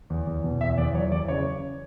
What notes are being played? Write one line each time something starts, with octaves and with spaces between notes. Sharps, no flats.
E2
E2
B2
E2 E5
E2 D5
F#3 C#5
E2 D5
C#3 C#5